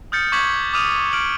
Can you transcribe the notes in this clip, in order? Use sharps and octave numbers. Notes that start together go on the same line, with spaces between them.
D#6 F6 G6 A6 C#7
C#6 D6 G6 G#6 B6 F#7
D6 D#6 F6 D#7 F7
F6 D7 F#7